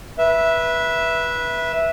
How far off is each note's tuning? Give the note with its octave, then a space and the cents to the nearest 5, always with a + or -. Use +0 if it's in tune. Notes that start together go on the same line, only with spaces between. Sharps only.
B4 -20 E5 +0